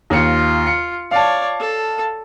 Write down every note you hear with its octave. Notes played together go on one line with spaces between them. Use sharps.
D#2 F4 C#7
C#7
C#5 D5 F5 A5
A4